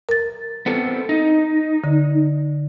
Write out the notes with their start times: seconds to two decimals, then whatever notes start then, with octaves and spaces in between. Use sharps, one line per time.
0.09 A#4 A6
0.66 B3 C4 A4
1.09 D#4
1.84 D3